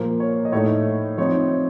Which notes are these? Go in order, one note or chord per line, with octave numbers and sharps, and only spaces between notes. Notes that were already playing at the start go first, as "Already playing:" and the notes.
Already playing: A#2 F3 A#3 C5
C#5
D#5
A2 A3 D#4 C#5
F3 C4 D#4 C#5